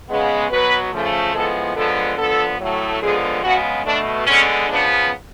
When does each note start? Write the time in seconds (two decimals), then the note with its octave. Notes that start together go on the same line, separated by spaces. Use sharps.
0.09 C#3 G#3 B3
0.51 B2 F#3 B3 B4
0.93 C#3 F3 A3
1.34 A2 F3 G#3 B3 A4
1.75 D3 F3 G#3 B3 A4
2.17 D3 F3 B3 A4
2.59 A2 F#3 A3
3.01 D3 F3 G#3 B3 G#4
3.42 C#3 G#3 B3 F#4
3.84 B2 A3 D4
4.26 D3 G#3 B3 C#4
4.67 C#3 F3 B3 D4